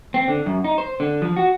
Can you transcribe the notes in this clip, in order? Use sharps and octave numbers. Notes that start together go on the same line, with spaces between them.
C4
D3
F#2
D#4
C5
D3
F3
F#4